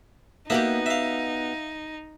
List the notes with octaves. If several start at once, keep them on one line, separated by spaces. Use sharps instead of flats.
A#3 B3 D#4 F#4 G4 E5
E5 F5